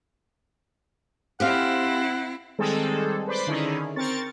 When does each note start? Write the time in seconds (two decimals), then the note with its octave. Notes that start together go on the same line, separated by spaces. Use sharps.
1.40 C4 E4 G4 C5 F5 F#5
2.59 D#3 G3 G#3 C4 G#4 A4
3.27 B4 C5 D5 B5 C6
3.47 D3 D#3 C#4 D#4 E4 G#4
3.96 C4 A#4 C#6 A6